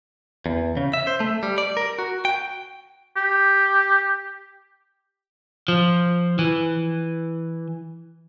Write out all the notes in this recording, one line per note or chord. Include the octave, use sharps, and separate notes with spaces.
E2
C#3
E5
C5
A3
G3
D5
A#4
F#4
G5
G4
F3
E3